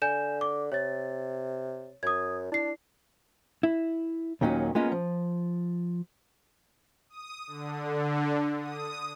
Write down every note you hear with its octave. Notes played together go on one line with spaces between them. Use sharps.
D3 G#5 G6 E7
D6
C3 C#5 A6
F#2 D#6 G#6
D4 E4 C7
E4
D#2 A#2 D#3 F#3 C#4
G#3 A#3 B3 C#4 F4 D#5
F3
D#6
D3
D#6